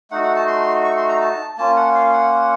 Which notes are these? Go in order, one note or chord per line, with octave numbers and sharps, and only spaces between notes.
A3 D#4 F#4 F#5
F#5
A5
C6
C#6
C6
A#5
A5
A#3 C#4 F4 A5
F#5
F5
F#5